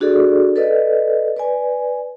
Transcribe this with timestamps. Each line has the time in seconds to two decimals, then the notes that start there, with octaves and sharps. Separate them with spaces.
0.01 D4 F#4 G#4 A4 D5
0.56 A4 B4 D5 D#5
1.37 B4 D5 G#5